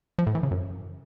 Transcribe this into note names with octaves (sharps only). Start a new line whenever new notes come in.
F3
A2
E3
C#3
F#2